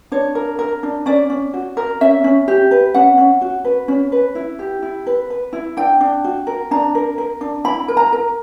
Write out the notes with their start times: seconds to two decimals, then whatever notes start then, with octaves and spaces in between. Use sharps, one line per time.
0.12 D4 C#5
0.35 A#4
0.59 A#4
0.83 D4
1.06 C#4 D5
1.30 C#4
1.54 F#4
1.77 A#4
2.01 C#4 E5
2.24 C#4
2.48 G4
2.71 B4
2.94 C#4 F#5
3.18 C#4
3.41 F#4
3.64 B4
3.88 C#4
4.12 B4
4.35 E4
4.59 G4
4.83 E4
5.07 B4
5.30 B4
5.53 E4
5.77 D4 G5
6.00 D4
6.24 F#4
6.47 A#4
6.71 D4 A#5
6.95 A#4
7.18 A#4
7.41 D4
7.64 E4 B5
7.88 A#4
7.97 A#5
8.13 A#4